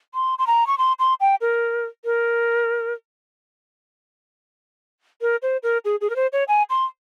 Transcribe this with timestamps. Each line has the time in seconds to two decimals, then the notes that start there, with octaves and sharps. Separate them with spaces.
0.14 C6
0.39 C6
0.47 A#5
0.67 C#6
0.78 C6
0.99 C6
1.21 G5
1.41 A#4
2.05 A#4
5.21 A#4
5.42 C5
5.63 A#4
5.85 G#4
6.01 G#4
6.10 A#4
6.16 C5
6.33 C#5
6.48 G#5
6.70 C6